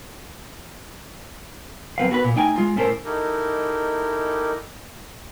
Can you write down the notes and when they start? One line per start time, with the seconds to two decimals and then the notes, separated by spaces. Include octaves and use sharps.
1.98 F#2 C4 B4 F5
2.10 B3 F#4 G#4 B4
2.24 A#2
2.36 A3 D#4 G5 G#5
2.56 G#3 F4
2.76 A2 C#4 A4 A#4 C5
3.05 D#4 E4 G4 A4 A#4 D#5